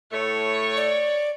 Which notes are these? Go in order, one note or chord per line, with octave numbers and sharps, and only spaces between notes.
A2 A3 C#5
D5